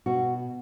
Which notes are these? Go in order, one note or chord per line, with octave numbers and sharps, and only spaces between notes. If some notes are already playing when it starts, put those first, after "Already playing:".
B2 F#4